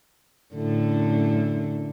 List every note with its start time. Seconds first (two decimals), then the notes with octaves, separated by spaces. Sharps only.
0.54 F#2 A2 D3